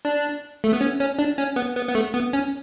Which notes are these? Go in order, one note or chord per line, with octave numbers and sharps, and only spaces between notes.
D4
A3
B3
C#4
C#4
D4
C#4
B3
B3
B3
A3
B3
C#4